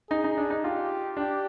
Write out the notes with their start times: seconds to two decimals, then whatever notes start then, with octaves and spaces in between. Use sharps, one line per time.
0.10 D#4 G#4
0.24 D#4
0.37 D4
0.50 D#4
0.64 F4 G4
1.17 D4 G4